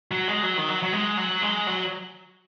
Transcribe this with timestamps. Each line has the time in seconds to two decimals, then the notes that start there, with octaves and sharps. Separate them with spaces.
0.11 F#3
0.28 G#3
0.43 F#3
0.57 D#3
0.68 F#3
0.83 F#3
0.93 G#3
1.17 F#3
1.42 G#3
1.67 F#3